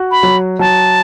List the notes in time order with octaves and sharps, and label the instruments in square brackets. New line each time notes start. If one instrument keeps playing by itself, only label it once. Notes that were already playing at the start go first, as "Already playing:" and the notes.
Already playing: [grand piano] F#4
[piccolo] B5
[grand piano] F#3
[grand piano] F#3 [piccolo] A5